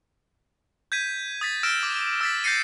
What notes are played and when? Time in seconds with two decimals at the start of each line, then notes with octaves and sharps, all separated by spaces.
0.92 G6 G#6 B6 D#7
1.41 D#6 A6 B6
1.63 E6 F6 A#6 D7 E7
1.83 D6
2.21 E6 A6 B6
2.44 G6 A6 A#6 C7 C#7 D#7